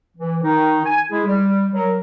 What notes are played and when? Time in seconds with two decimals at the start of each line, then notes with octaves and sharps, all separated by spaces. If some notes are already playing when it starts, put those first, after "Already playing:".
0.17 E3
0.42 D#3 D#4
0.84 G#5
1.11 G#3 E4 G#4
1.25 G3
1.73 F#3 A#4